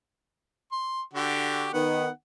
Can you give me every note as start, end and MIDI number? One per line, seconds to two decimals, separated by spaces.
0.72 1.02 84
1.14 1.70 50
1.14 1.70 66
1.14 1.70 67
1.73 2.08 51
1.73 2.08 59
1.73 2.10 78